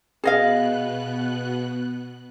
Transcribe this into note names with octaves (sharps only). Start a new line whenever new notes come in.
B2 B3 G#4 D#5 F5 F#6